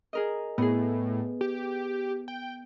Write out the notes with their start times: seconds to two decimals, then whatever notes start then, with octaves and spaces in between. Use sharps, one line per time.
0.13 G#4 A#4 D#5
0.58 A2 B3 G#4
1.41 G4
2.28 G5